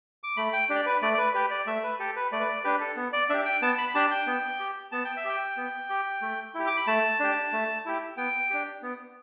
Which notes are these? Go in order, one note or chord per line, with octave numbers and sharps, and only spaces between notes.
D6
A3 B5
G5
D4 G4
D5
B4
A3 D5
D5
B4
G4 B4
D5
A3 E5
B4
G4 A4
B4
A3 D5
B4
D5
D4 G4 B4
A4
B3
D5
D4 G4 E5
G5
B3 A5
B5
B5
D4 G4 A5
G5
B3
G4
B3 A5
G5
E5
G4 G5
B3
G4
A3
E4 G4
D6
B5
A3 A5
D4 G4
A3
E4 G4
B3 G5
D4 G4
B3